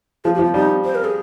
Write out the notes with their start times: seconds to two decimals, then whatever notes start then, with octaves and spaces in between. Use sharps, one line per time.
0.24 F3 G#4
0.35 G4
0.39 F3
0.44 F4
0.54 G3 D#4
0.84 C5
0.95 A#4
1.04 G#4